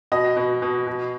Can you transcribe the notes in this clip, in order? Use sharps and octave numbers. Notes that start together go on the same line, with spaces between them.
B2 D#5
B2
B2
B2